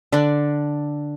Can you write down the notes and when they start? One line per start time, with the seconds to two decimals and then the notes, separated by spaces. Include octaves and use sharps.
0.12 D3 D4